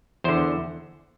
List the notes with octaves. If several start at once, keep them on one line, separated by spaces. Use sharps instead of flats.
E2 D3 C5